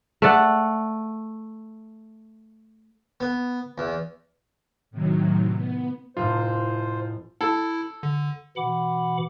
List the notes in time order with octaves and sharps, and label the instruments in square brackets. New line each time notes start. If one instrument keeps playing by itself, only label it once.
[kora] A3 D5 F#5
[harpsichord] B3
E2
[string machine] A2 C3 D#3 F#3
B3
[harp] F1 A2 [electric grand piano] F4 [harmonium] C5
[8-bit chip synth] E4 [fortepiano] A4
[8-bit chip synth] D3
[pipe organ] B2 E3 F#5 B5 D6